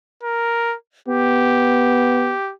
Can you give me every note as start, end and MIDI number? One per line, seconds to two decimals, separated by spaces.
0.23 0.76 70
1.08 2.34 59
1.08 2.52 67